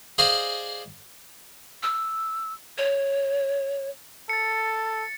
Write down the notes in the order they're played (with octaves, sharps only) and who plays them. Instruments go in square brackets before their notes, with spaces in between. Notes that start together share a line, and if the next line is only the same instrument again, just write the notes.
[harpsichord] G#4 C5 D5 D#5 F5 G#5
[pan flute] E6
C#5
[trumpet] A4 [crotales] A6 C#7